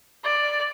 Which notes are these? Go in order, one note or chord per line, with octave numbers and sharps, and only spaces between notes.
D5